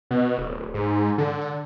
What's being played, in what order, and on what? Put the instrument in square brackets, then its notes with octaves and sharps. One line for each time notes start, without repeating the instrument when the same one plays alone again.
[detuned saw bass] B2
D1
G#2
D3